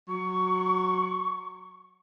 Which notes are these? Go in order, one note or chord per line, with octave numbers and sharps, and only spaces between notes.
F#3 C#6